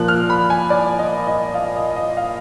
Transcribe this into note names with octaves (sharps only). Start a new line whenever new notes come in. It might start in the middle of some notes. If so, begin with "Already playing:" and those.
Already playing: A#2 F3 A#3 F#6
F6
B5
G#5
D5
D#5
D#5
F5
D#5
D#5
F5